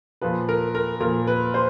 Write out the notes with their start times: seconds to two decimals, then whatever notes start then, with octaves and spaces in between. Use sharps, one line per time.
0.21 A#2 F3 B4
0.49 A#4
0.75 A#4
1.00 A#2 F3 A#4
1.27 B4
1.54 C5